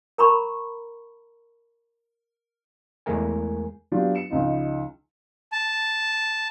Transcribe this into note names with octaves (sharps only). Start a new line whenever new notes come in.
A#4 A#5 B5 C#6
E2 G#3 A3 A#4 G#5
F#3 B3 D4 F4 G4
C#7 E7
C#2 F3 D#4 F4
A5